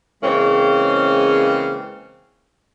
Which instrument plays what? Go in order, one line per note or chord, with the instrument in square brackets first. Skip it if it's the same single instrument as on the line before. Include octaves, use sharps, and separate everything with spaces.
[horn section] C#3 E3 G#3 A#3 C4 C#4